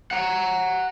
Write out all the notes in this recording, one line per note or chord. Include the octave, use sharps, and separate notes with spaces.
F#5 A#5